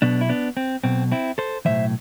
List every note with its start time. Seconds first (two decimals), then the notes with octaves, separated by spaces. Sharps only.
0.02 B1 B2 B3 D4
0.21 E4
0.29 B3 D4
0.57 C4
0.84 B1 B2 C4
1.12 C4 E4
1.38 A4 C5
1.65 B1 A2 E3 C5 E5